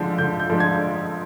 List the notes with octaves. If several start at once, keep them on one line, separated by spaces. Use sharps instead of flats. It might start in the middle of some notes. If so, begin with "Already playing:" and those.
Already playing: D3 F3 G#3 D4 G6
D3 G6
G6
F3 G#3 D4
G#6